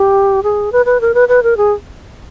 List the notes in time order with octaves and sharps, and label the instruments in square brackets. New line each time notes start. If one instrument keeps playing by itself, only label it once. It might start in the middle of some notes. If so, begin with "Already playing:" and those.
Already playing: [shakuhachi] G4
G#4
B4
B4
A#4
B4
B4
A#4
G#4